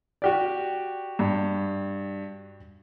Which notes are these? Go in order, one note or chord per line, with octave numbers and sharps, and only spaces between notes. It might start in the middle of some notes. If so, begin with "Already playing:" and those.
F#4 G4 D5
G2